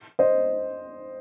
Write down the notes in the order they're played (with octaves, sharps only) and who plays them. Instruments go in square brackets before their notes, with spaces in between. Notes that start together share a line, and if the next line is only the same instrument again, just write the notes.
[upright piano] C5 D#5